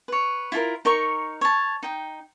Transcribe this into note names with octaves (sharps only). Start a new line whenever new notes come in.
B4 C#5
E4 F4 A4 A#4
D#4 A#4 C#5 C#6
C#5 A5
D#4 G5